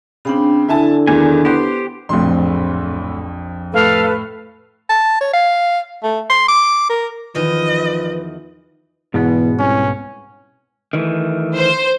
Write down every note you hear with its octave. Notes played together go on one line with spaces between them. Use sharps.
C#3 C4 D4 G5 B5
D3 E4 E5 G#5 A5
E2 D#3 G#3 G#5
B3 G4 C5
D1 A#1 F2 A2 C6
A2 A4 B4 F5 F6
A5
C#5
F5
A3
C6
D6
A#4
E2 D#3 F3 B4 D#5
E2 G#2 B2 B3
C2 C#4
D#3 E3 A3
C5